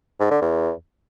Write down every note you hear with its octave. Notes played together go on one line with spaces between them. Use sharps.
G#2
D3
E2